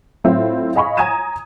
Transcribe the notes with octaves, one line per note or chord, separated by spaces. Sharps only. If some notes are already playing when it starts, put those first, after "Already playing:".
A2 F#3 C4 E4 F4
D#5 F5 G#5 B5 C#6
G#5 A#5 D#6 G#6 D#7 E7